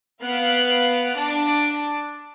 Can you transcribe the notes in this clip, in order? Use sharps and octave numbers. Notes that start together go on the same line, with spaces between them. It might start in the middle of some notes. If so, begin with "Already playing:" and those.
B3 F5 F#6 D7
D4 D6